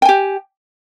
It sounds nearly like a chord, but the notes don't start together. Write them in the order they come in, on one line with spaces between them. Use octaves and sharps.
G5 G#5 G4